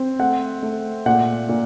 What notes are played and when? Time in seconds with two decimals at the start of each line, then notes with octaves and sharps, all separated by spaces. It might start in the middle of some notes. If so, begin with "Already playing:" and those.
Already playing: C4
0.20 A3 F#5
0.63 A3
1.06 A#2 F#5
1.49 A#2